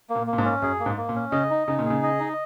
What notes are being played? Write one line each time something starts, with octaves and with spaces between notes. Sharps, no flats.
A#3
A#2
A#3
A#2
G#2
C#4
F#2 G#4
A#3
G#2
A#3
A#2
C#4
C#3 D#5
D#4
C#3 D#4
A#2
C#3 G#4
D#5
D#4